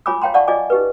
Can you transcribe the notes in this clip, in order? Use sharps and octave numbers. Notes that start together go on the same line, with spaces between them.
F4 C#5 G#5 B5 D6 E6
C#5 F5 G5 A#5 C6
D5 F5 F#5 A5 C#6
F4 D5 D#5 G#5 D6
D#4 G4 B4